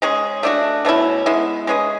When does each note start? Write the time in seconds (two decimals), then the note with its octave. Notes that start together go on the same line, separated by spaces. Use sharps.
0.02 G#3 C#4 G#4
0.43 A3 D4 F#4
0.85 B2 A3 C#4 E4
1.26 G#3 B3 E4
1.67 G#3 C#4 G#4 B4